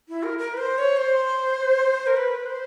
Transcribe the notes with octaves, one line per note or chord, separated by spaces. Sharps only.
E4
A#4
A#4
B4
C5
C#5
C5
A#4
B4
C5